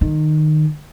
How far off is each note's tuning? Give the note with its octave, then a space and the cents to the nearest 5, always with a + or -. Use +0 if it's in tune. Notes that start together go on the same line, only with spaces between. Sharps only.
D#3 -20